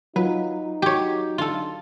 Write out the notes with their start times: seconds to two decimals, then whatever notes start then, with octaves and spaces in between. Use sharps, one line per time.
0.16 F#3 D#4 F4 B4
0.82 F#4 G4 C#5
1.38 D3 F4 A4